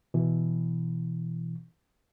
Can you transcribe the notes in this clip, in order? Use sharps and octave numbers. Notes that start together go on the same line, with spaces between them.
B2 E3